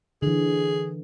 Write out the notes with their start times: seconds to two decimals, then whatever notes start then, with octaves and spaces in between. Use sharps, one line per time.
0.22 D3 E3 G#4